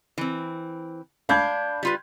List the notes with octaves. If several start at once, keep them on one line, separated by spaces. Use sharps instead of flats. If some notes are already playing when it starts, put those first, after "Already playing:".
E3 C4
D4 F5 B5 G6 G#6
G3 F4 B4